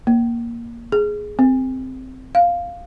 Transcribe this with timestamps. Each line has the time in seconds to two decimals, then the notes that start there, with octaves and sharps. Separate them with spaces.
0.07 A#3
0.92 G#4
1.39 C4
2.35 F5